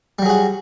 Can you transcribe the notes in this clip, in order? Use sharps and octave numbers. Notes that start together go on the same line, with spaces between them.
F#3 G3 F#4 G#4